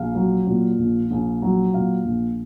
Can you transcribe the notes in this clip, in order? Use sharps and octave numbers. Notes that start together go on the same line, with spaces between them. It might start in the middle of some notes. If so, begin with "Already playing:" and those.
Already playing: A#1 F5
F#3
A#2
A#1
A#1
F#3
A#2 F5
A#1